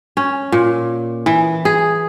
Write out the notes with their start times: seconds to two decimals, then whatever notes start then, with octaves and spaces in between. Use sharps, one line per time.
0.17 C#4
0.52 A#2
1.26 E3
1.65 G#4